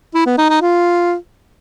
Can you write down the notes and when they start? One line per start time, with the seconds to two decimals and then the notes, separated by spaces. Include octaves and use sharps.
0.14 E4
0.26 B3
0.38 D#4
0.50 D#4
0.62 F4